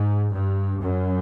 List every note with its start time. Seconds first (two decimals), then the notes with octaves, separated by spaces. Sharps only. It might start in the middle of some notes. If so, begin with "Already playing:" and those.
Already playing: G#2
0.32 G2
0.79 F#2